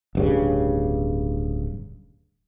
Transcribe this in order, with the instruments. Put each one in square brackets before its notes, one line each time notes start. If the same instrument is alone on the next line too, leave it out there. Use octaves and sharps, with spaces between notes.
[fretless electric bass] D1 G2 C#3